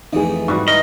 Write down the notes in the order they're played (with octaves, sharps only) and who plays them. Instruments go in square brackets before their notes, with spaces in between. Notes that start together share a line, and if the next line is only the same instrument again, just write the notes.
[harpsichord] F2 A2 E3 [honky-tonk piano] D#4 G#4
[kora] G#2 G3 F#4 [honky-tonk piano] C#6
[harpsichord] E3 D#4 [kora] A#4 [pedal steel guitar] D#5